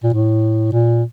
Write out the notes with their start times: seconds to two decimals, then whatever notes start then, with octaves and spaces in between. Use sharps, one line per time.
0.04 A#2
0.13 A2
0.72 A#2